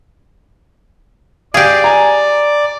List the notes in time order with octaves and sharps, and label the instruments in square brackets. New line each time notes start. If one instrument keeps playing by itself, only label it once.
[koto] G4 G#4 [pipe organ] D5 [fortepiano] F5
[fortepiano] G#5 A#5